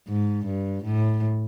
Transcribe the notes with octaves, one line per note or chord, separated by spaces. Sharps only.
G#2
G2
A2